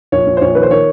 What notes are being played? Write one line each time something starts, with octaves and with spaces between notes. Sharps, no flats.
A#1 C#5
A#1
C5
A#1 C#5
D#3 B4
C5
D#3 C#5